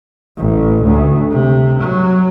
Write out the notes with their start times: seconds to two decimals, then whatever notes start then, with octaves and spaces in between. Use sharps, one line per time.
0.38 A1
0.84 D2
1.31 C3
1.80 F#3